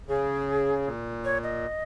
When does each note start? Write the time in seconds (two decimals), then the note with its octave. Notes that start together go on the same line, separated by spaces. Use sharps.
0.08 C#3 G#4
0.86 A#2
1.24 C#5
1.43 D#5